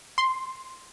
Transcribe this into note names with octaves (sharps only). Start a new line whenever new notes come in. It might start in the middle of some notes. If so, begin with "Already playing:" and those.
C6